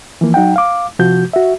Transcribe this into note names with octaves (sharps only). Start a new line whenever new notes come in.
E3 F3 A#3
F#3 D#4 F#5 G5
F5 D6
C3 F3 F#4 G6
F#4 E5